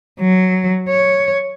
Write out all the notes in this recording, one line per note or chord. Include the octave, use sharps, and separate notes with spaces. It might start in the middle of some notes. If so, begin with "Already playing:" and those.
F#3
C#5